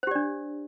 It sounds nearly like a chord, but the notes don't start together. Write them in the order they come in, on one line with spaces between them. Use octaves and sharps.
C5 G4 D5 D4